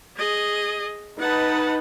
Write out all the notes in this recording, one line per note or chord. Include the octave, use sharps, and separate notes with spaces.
G#4 D#5
D#4 B4 F#5 A5